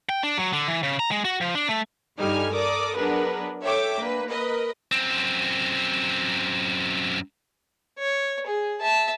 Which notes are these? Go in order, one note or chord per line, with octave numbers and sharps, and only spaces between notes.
G5
D4
F#3
D3
E3
C#3
A#5
G#3
F#4
F3
D4
A3
G2 D3 G3 D#4 G#5 F6
A4 A#4 D5 D6 D#6
F#3 B3 D4 G#4 A#4 B4
A4 C#5 E5 G5 D6
A#3 D4 B4
A#4 B4 D#5
F#2 C4
C#5
G#4
E5 A5